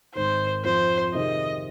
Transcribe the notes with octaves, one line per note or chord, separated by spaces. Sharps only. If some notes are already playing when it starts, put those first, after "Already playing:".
G#1 G#2 D#3 C5
F2 F3 C4 C5
C3 D#3 C4 G#4 C5 D#5